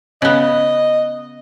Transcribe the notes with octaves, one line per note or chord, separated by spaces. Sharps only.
C#3 B3 D#5